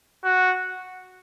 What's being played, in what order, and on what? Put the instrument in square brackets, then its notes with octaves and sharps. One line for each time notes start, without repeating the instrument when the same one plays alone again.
[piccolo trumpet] F#4